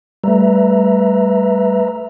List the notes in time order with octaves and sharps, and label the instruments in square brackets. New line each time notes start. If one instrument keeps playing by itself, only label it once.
[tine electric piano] G3 A3 [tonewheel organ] B4 E5 A#5